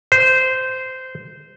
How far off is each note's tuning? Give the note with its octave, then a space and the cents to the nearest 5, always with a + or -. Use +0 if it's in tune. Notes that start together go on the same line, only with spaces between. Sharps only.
C5 -15